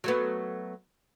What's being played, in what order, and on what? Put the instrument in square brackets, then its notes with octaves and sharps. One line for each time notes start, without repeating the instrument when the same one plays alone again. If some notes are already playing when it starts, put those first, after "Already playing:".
[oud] F#3 A3 B3